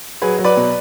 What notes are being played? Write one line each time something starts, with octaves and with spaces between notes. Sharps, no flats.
F#3 G#4 B4
F#3
B4 D5
B2